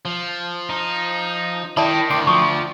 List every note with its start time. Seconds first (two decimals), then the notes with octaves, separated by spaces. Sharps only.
0.05 F3
0.70 D#4
1.77 D#3 E4 D5 G5 A5 B5 D#6
2.10 D2 G5 C6 D6
2.27 F3 C#6 D#6